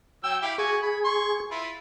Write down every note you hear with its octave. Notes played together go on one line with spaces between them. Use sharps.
F#3 G5 E6
E4 G4 F5
F#4 G#4 G#5 C#6
B5
C6 C#6
E4 F4 B4